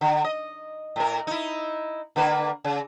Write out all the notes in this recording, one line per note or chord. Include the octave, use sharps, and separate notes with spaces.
D3
D#5
A2 A#4
D#4 E4
D3 A#3 B4
C#3